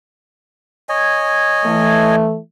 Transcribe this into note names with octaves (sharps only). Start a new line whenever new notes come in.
C#5 D#5 G#5
E3 A3